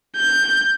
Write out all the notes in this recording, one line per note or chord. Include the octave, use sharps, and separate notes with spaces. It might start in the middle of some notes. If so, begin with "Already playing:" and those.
G6